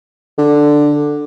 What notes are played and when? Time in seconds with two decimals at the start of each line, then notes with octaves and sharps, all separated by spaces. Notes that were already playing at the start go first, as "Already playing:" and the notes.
0.38 D3